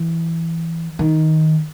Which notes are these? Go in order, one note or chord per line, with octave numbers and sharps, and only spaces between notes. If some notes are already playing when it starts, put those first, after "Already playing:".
Already playing: E3
D#3